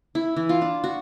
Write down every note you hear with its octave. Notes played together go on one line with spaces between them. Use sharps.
E4
E3
F4
D4
F#4